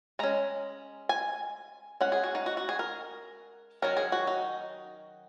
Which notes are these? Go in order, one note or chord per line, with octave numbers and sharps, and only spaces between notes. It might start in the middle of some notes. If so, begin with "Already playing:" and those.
G#3 C#4 A#5
G#5
G#3 C#4 F#5
G#4
F#4
D#4
F#4
F#4
G#4
A#4
D#3 F#3 C#4 A#4
G#4
F#4
D#4